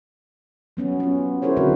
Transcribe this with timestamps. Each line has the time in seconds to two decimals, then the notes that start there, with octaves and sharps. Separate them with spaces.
0.77 F#3 B3 C#4
1.00 C#4 F4
1.42 E4 G#4 A#4 C5 C#5
1.57 D3 F#3 C4 D4 F#4 B4